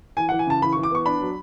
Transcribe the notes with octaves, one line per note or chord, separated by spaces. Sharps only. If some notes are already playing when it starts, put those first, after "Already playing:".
E3 G#5
F#5
E3
G#5
C#3 A5
E3 B5
C#6
E3
D6
B3 C#6
D4 B5
F#3